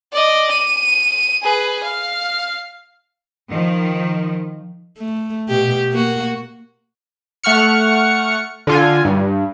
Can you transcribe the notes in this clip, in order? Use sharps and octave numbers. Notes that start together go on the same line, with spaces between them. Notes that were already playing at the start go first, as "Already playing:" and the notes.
D5 D#5
D#7
G#4 B4
F5
D#3 F3
A3
B2 G4
A#3 F#4
A3 F#5 C#6 F6 C#7
D3 F4 G#5
G2